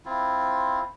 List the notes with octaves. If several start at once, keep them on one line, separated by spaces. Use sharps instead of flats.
C4 E4 F4